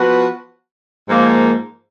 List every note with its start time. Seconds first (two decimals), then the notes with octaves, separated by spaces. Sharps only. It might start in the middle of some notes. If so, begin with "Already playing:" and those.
Already playing: F3 B3 F#4 B4
1.09 G#2 F3 A#3